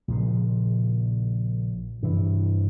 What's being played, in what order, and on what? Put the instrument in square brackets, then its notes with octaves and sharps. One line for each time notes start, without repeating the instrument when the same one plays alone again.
[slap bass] A#1 A#2 C#3
[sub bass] G2 [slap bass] C3 E3